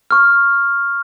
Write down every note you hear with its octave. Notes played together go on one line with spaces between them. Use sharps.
C#6 F6